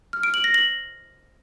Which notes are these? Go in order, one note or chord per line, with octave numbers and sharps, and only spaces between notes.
F6
D7
F#7
A#6
F#7